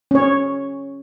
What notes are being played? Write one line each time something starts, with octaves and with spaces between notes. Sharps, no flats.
C#4 C#5